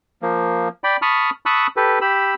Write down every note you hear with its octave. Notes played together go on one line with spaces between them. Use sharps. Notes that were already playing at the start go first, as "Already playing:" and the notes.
F3 A#3
D5 G5 B5
A5 B5 C#6 D#6 F6
A5 B5 C#6 D#6 E6 F#6
G4 A4 B4
G4 B5 E6